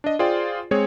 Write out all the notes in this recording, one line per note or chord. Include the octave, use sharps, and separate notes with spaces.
D4 D#5
F4 G#4 C5 D5 G5
G#3 C4 G#4 C#5